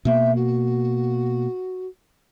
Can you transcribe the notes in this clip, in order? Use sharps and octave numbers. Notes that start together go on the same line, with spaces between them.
B2 A#3 E5
F#4